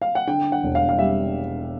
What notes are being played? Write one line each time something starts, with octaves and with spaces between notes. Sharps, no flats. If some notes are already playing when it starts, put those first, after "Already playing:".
F5
F#5
D3 G5
F#5
E1
F5
F5
G3 E5